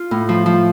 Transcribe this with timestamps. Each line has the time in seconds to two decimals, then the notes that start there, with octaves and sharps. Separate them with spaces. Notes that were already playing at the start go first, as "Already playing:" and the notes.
Already playing: F4
0.11 A2
0.29 F3
0.46 F3